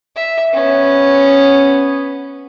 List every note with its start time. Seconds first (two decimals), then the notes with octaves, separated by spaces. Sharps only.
0.16 E5
0.53 B3 C#4